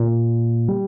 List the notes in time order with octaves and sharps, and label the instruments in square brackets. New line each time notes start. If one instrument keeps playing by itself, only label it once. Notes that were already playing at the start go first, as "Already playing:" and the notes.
Already playing: [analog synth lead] A#2
G3